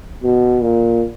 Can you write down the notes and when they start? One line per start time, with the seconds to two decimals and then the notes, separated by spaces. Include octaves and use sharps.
0.23 B2
0.62 A#2